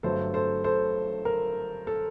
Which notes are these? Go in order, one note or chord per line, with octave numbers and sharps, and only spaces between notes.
G1 G2 F#3 A3 A4 C5
A4 C5
A4 C5
A#4
A4